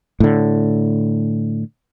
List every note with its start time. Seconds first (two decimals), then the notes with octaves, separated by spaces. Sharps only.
0.20 A2 D3